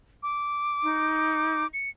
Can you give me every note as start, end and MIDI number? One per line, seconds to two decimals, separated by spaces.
0.23 1.67 86
0.83 1.63 63
1.74 1.89 97